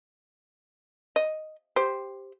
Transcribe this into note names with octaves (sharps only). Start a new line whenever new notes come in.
D#5
G4 C5